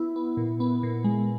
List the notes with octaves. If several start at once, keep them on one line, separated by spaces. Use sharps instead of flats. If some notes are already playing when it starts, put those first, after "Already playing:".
Already playing: B3 E4
B3
A#2
B3
A#2
G#3